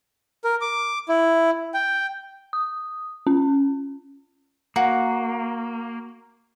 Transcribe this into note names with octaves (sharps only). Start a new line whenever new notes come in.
A#4
D6
E4
G5
D#6
C#4
A#3 F#4